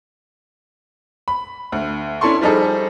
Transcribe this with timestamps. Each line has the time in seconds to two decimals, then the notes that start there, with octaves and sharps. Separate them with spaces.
1.28 B5
1.72 D2
2.21 C#4 D4 E4 A4 C6 C#6
2.41 F3 G3 D#4 G#4 A4